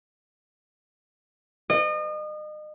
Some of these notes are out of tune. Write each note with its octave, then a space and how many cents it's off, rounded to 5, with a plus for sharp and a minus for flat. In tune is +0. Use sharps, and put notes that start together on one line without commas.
D#5 -35